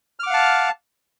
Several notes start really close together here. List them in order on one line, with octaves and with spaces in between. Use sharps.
F6 D6 F#5 F5 A5